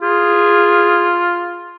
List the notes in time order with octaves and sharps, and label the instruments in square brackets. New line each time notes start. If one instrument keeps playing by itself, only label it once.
[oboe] F4 [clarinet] G#4